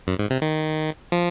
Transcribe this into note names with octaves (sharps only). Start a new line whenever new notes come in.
F#2
G#2
C3
D#3
F3